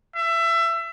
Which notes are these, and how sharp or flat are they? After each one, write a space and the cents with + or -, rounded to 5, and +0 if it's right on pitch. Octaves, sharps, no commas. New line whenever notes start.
E5 +25